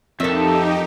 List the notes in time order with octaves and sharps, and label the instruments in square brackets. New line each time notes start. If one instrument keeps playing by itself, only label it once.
[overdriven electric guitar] F2 [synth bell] C4 A#4 [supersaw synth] D#4 G4 [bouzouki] A4 E5